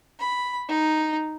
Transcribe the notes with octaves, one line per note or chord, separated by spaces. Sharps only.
B5
D#4